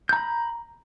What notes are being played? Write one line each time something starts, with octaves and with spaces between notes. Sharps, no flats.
A#5 B5 G6